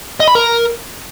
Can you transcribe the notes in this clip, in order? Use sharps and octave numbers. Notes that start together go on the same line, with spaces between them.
D#5
B5
A#4